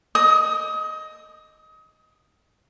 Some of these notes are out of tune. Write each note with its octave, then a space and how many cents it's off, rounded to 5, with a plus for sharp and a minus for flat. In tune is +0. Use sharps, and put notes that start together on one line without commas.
D#5 -5 D#6 +30